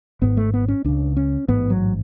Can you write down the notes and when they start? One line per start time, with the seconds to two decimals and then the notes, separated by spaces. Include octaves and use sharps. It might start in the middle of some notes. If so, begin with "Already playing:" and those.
0.21 G#1 G#2 B3
0.37 A3
0.54 B3
0.68 C#4
0.84 C#2 C#3 D4
1.17 C#4
1.48 A1 G#2 B3
1.70 F#3